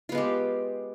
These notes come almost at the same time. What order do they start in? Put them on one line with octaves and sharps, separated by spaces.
F4 B3 G#3 G4